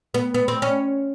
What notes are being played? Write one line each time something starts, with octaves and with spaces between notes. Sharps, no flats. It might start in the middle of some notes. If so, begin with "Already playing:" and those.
B3
B3
C4
C#4